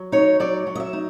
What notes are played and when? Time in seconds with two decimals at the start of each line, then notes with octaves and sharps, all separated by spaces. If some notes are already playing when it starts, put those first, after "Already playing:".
Already playing: F#3
0.12 D#4 C#5
0.40 F#3 D5
0.67 F#3
0.75 D#5
0.80 E5
0.93 D#4